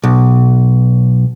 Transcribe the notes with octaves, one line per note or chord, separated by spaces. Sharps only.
B1